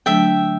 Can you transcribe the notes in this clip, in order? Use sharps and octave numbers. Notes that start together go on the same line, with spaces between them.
D3 F#3 A3 D4 E5 G5